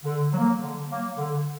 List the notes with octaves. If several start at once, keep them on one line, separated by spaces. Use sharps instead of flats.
D3
F#3
A#3
D3
F#3 A#3
D3